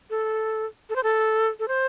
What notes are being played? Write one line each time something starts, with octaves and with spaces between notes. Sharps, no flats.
A4
A4
C5
A4
A4
C5